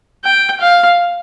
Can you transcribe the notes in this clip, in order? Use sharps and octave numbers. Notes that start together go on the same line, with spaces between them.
G5
F5